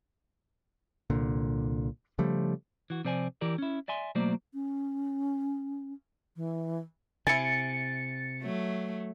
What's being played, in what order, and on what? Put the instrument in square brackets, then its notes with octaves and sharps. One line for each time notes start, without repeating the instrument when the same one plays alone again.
[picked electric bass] C2 A#2 D3
C#3 F3 G3 A3
[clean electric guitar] E3 F#4
C3 F3 C5 D5 G#5
E3 G4 A#4 D5
C#4 E4
D5 E5 G#5 C6
B2 F#3 A3 A#3 C5 D5
[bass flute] C#4
E3
[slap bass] C3 [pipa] E4 G#5 [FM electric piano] A6 C#7
[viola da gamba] F#3 A3